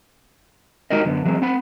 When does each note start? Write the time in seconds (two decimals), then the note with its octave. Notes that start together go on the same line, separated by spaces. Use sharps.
0.90 G#3 D#4 F#4 G4 A#4 D#5
1.05 F#2 D3 B3
1.25 E3 F#3 G#3 A#3 C4
1.42 C4 F#5 B5